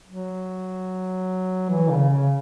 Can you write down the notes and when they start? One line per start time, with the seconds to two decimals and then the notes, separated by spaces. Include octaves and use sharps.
0.08 F#3
1.69 E3
1.90 C#3
2.10 C#3